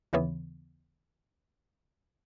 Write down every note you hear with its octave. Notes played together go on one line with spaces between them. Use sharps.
D#2 C#3 E3 B3